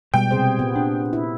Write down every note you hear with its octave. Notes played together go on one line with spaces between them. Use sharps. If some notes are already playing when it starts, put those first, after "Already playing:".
B2 G3 G#3 G5
C3 G#4 C5
A#2 B3
D4
E4